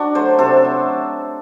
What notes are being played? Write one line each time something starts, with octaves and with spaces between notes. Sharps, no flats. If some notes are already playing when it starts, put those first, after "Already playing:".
Already playing: D4 F#4
F#3 A3 A4 C5
C3 A4 C5
F#3 A3